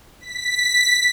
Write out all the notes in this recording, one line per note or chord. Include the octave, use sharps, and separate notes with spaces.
B6